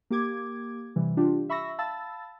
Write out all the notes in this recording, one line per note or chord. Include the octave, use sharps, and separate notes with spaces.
A#3 G4 D6 G#6
C3 E3 G3
D4 F4 G4
E5 B5 C#6 E6 A#6
F5 A5 B5 E6 A6